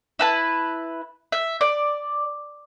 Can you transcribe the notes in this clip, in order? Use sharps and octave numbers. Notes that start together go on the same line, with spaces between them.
E4 B4 A5
E5
D5